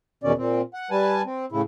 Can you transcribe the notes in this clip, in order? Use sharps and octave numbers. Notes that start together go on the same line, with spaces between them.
E2 B2 D#3 C#4 D5
A#2 C4
F#5
G3 B4 G#5 A5
C4
A2 C#3 E4